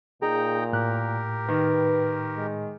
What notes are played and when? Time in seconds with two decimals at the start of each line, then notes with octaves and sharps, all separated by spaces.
0.22 A#2 D#4 G#4 G5 A#5
0.73 A2 G4 A#4 F#6
1.48 D#3 B4
2.37 G#3